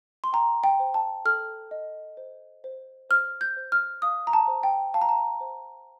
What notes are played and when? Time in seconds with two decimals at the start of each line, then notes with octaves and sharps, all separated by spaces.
0.24 C6
0.33 G5 A#5
0.64 G5
0.80 C5
0.94 A5
1.25 A4 F6
1.71 D#5
2.17 C5
2.64 C5
3.10 C5 F6
3.41 G6
3.57 C5
3.72 F6
4.02 F5 D#6
4.27 A#5
4.33 A5
4.48 C5
4.63 G5
4.94 F5 A5
5.01 A#5
5.09 A5
5.41 C5